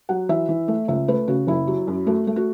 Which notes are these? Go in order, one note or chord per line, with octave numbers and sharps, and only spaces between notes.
F#3 F#5
E3 E5
E3
A3
C#2 E5
A3 B4
C#3 F#4
F#1 E4
F#3
F#2
A3 F#4
A3
F#4